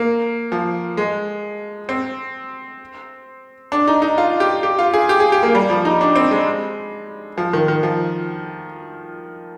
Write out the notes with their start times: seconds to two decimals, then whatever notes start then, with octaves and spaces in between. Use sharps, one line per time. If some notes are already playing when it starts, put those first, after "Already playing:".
Already playing: A#3
0.52 F3
0.97 G#3
1.89 C4
3.72 D4
3.87 D#4
4.02 D#4
4.18 F4
4.40 G4
4.63 G4
4.79 F4
4.94 G#4
5.09 G4
5.20 G#4
5.32 G4
5.43 A#3
5.55 G3
5.70 F3
5.85 D#4
6.01 D4
6.16 C4
6.31 G#3
7.38 F3
7.53 D#3
7.68 D#3
7.83 F3